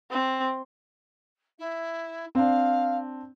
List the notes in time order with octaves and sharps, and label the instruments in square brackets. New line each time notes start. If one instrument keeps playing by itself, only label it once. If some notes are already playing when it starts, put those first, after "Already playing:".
[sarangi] C4
[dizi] E4
[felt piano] C4 D4 [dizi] F5